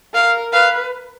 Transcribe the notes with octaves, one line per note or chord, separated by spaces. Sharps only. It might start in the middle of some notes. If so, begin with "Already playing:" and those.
A#4 F5
B4 F5